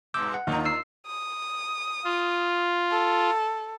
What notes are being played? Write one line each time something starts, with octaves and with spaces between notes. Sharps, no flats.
G2 B2 G#3 D6 E6 G6
F#5
D#2 D4 D#4 F4
E6 C7
D#6
F4
A4